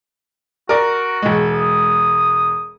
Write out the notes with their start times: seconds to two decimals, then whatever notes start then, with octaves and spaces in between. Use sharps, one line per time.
0.69 F#4 A#4 D5
1.22 E1 G#3
1.55 D#6